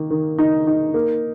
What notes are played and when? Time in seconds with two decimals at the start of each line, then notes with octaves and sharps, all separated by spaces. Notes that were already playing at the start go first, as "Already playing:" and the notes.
Already playing: D#3 A#3
0.10 D#3
0.39 D#4
0.67 D#4
0.94 A#3